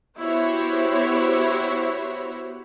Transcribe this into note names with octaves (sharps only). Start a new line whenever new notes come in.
B3 E4 F#4 G4 C5 C#5